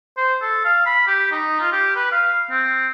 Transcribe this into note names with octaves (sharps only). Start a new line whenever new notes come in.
C5
A4
F5
B5
G4
D#4
F4
G4
B4
F5
C4